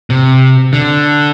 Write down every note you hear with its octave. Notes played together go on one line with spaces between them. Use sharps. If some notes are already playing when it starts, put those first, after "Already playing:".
C3
D3